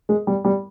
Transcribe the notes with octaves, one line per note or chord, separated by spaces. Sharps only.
G#3
G3
G3